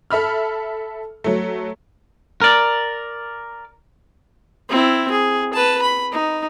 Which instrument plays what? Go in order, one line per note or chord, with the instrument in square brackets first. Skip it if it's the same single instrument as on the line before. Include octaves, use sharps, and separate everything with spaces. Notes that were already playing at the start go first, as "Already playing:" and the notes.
[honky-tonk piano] A4 E5 B5 F6
F#3 A3
[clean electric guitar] A#4 D5
[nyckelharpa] C4 E4
G#4
B4 A5
B5
D#4